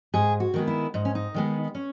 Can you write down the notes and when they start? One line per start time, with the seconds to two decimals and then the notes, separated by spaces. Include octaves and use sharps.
0.14 G#2 G#4
0.40 F#4
0.54 D#3 G#3 B3
0.68 E4
0.94 G#2 D#4
1.05 C#4
1.15 D#4
1.34 D#3 G#3 B3
1.75 C#4